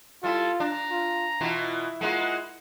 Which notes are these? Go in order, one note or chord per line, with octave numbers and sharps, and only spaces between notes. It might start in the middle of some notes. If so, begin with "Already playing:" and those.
G3 E4 F4 A4
D4 A#5
F4
B2 E3 E4 F4
G#3 A#3 F4 F#5